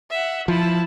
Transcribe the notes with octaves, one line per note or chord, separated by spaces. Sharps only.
E5 F#5
F3 E4 A5